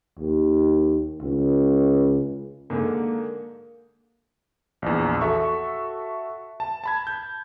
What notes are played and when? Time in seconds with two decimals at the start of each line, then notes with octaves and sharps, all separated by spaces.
0.19 D#2
1.22 C#2
2.70 G#2 D3 A#3
4.82 A#1 E2
5.21 F#4 A4 E5 C#6
6.60 A5
6.84 A5 B5 G#6
7.07 G6